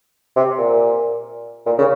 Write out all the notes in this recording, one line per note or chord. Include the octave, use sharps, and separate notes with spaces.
C3
A#2
A#2
C#3